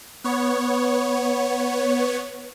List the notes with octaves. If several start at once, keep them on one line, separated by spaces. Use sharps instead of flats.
B3 C#5